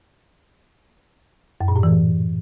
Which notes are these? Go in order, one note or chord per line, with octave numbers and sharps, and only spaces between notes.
F#2
A#2
A2
E3